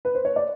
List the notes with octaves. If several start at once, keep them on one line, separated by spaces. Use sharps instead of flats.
B4
C5
C#5
D5